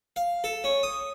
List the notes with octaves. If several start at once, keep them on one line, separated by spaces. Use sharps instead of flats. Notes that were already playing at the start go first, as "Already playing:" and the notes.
F5
A4
C#4
D#6